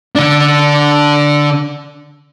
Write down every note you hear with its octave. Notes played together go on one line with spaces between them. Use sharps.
D3 D4